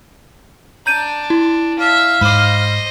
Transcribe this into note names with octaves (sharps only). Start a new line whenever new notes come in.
D4 A#5 G6 D#7
E4
E5 F5
G#2 C5 D#5 B5 D6